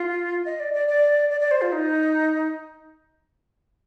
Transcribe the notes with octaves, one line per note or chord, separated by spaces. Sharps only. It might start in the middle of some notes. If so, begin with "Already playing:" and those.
Already playing: F4
D#5
D5
D5
D5
D5
D5
C5
F4
D#4